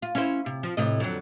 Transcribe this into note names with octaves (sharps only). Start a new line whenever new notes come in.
F4
C#4 E4 C5
C3
F3
A2 C3 D#5
F2 D3 F#3